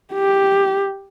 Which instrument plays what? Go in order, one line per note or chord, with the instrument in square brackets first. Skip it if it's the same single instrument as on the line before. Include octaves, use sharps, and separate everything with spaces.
[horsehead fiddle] G4